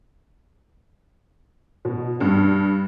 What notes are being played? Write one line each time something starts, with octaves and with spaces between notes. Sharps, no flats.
B2
G2